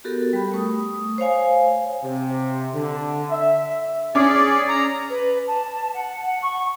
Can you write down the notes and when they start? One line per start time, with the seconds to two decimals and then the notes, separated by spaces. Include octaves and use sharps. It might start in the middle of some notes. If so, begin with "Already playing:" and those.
0.04 B3 F#4 G4 A4 A#4
0.33 G3 B5
0.52 A3 C#6 D#6
1.18 C5 C#5 F5 G#5
2.03 C3
2.74 D3
3.30 E5
4.15 C#4 G#4 D5 D6
4.69 A#5
5.10 B4
5.47 A5
5.94 F#5
6.24 F#5
6.42 C#6